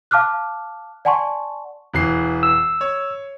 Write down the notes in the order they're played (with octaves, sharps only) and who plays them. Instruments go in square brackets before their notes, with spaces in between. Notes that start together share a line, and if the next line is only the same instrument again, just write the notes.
[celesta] F5 A5 D6 F6 F#6
D5 F#5 G#5 A5 C6 C#6
[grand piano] E1 E3 C7
[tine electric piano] E6
[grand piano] C#5